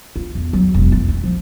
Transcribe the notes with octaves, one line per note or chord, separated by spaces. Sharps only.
F4
E2
F#3
E1
E4
C4
F3